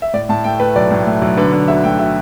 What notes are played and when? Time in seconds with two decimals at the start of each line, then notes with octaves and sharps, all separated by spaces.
0.02 E5
0.13 A2 D5
0.29 A2 A5
0.44 A3 G5
0.60 A3 B4
0.75 B1 D5
0.91 A2
1.07 A3
1.22 B1
1.37 D3 B4
1.53 D3
1.68 D2 E5
1.84 A3 G5
1.99 D3 E5